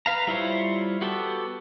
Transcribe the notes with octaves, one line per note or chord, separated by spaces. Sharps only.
B4 F5 A#5
G3 E4 F4 C5 C#5
B3 F#4 G4 A4